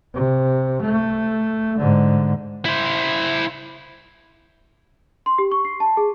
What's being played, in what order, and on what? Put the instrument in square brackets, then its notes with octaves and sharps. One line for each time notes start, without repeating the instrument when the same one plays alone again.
[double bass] C3
A3
G#2 D3
[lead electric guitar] E4 C5
[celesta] C6
G4
C#6
C7
A5
G#4